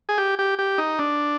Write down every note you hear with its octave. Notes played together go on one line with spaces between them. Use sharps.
G#4
G4
G4
G4
D#4
D4